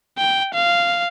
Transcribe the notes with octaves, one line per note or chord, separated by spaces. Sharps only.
G5
F5